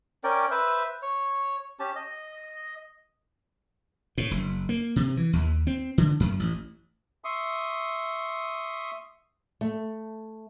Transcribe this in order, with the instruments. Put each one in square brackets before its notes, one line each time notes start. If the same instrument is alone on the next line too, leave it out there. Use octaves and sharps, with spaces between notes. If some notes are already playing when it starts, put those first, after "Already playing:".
[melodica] C#4 A#4 D5 G5
B4 C5 E5
C#5
C#4 G4 A5
D#5
[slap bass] A2
F#1
A#3
C3
E3
D#2
C4
D3
F#2
A1
[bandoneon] E5 C6 C#6 D#6
[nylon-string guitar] A3